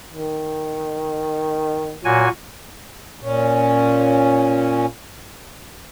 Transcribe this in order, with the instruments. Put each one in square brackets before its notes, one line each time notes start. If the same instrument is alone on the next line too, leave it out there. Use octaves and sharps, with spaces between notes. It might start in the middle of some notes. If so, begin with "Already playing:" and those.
[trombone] D#3
[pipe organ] A#2 F#4 G#5 [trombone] F#3
[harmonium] A#2 C#4